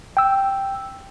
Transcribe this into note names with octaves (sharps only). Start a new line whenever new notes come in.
G5 E6